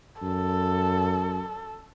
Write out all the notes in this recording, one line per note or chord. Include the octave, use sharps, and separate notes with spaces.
F#2 A4